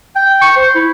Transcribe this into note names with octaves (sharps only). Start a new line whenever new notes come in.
G5
C#6
C5
E4